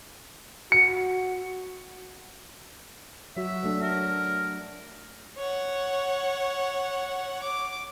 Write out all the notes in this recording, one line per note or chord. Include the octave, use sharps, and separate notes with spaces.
F#4 C#7
F#3 F#4 E5
F#3 A3 D4
A#4
C#5 F#5
D6